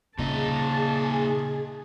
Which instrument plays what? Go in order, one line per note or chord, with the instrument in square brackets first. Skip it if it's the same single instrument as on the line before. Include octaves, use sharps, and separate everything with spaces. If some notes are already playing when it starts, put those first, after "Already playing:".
[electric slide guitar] A#2 D#4 [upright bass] C#3 [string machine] G#4 [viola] A5